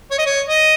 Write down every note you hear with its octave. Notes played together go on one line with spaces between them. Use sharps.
C#5
D#5
C#5
D#5